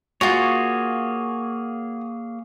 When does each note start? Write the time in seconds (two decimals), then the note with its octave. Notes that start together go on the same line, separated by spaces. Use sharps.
0.21 A#3 F4 F#4 G#4 C#5